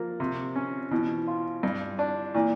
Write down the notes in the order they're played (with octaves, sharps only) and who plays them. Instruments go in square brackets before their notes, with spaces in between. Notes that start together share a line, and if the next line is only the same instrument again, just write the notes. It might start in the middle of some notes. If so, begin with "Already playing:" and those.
Already playing: [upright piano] F3 [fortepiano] A#3
[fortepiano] C3
C#4
[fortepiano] B2 [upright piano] E3
[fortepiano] F4
G2
D4
[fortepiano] A#2 [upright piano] E3